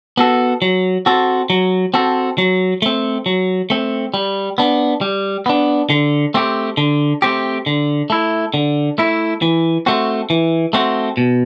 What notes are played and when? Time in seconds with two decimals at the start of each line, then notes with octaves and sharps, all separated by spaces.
0.17 B3 F#4 A4
0.62 F#3
1.06 C4 F#4 A4
1.50 F#3
1.94 C4 F#4 A4
2.38 F#3
2.82 A3 C4
3.26 F#3
3.70 A3 C4
4.14 G3
4.58 B3 D4
5.01 G3
5.46 B3 D4
5.90 D3
6.34 A3 C4 G4
6.77 D3
7.22 A3 C4 G4
7.66 D3
8.10 A3 E4
8.54 D3
8.98 A3 E4
9.42 E3
9.86 A3 C4 F#4
10.30 E3
10.73 A3 C4 F#4
11.17 B2